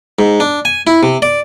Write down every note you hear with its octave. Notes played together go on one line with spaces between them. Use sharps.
G#2
D4
G#5
E4
C3
D5